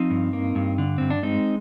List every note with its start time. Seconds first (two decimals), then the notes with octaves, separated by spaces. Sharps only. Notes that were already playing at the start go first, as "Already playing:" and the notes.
Already playing: F3 C4 D#4
0.10 G2
0.33 A#3
0.55 G2
0.78 D3
0.98 G2 C4
1.10 D4
1.23 G#3 C4 D#4